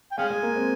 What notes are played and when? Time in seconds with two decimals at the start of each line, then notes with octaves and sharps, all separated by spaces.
0.12 G5
0.18 G#3 F5 G#5
0.31 G#3
0.43 A#3
0.56 C4